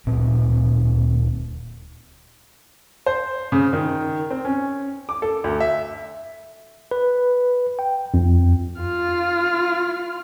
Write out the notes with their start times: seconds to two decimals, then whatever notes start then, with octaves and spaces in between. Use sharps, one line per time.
0.06 D1 A#2 C4
3.06 C5
3.52 C#3
3.73 D#3
4.30 C4
4.45 C#4
5.09 D6
5.22 A4
5.44 D2
5.60 E5
6.91 B4
7.79 G5
8.14 F2
8.81 F4 F6